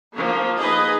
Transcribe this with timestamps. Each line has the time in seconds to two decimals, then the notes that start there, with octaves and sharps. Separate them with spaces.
0.14 F3 A#3
0.60 D#4 G#4 B4 D#5